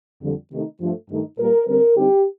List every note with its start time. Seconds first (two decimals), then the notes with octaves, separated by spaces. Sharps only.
0.22 F2 D3 G3
0.52 C3 D#3 A3 D#4
0.81 G2 F3 A3
1.10 G2 D#3 A3 D#4
1.38 A#2 G3 A#3 A#4
1.67 D3 G3 C4 A#4
1.96 D3 G3 C4 D#4 G4